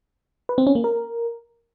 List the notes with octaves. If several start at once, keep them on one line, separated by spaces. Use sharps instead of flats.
B4
C4
C#4
A#3
A#4